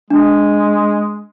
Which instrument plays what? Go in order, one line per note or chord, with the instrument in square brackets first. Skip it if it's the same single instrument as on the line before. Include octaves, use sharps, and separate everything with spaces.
[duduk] G#3 [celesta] D4